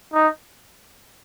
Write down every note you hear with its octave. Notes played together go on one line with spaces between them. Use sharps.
D#4